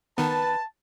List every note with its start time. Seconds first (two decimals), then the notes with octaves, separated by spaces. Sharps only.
0.18 D#3 B3 B4 A5